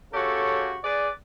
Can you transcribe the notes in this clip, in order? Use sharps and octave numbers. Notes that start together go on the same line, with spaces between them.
C#3 F#4 G4 A4 C#5
G#4 B4 D5